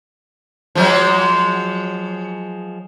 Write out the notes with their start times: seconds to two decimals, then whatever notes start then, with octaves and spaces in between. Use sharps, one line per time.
0.75 F3 F#3 G#3